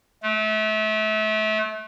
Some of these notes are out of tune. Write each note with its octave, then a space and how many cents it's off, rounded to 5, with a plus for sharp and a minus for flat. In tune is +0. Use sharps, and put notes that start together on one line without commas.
A3 -30